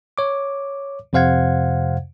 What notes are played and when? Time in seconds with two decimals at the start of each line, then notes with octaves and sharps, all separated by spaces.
0.18 C#5 D6
1.13 F2 C3 C5 F5 F#5 G#6